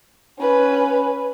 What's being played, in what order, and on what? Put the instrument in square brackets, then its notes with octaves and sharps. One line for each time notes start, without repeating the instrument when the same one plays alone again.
[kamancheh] C#4 B4